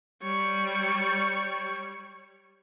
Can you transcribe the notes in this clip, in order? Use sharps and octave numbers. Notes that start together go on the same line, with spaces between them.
G3 C#5